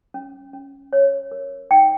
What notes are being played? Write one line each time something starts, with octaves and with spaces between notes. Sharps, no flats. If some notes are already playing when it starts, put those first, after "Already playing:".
C#4
C#4
C#5
A#4
D#4 G5